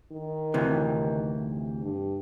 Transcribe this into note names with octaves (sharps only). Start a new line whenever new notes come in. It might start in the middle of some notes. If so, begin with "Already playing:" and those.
D#3
D2 C3 E3
G2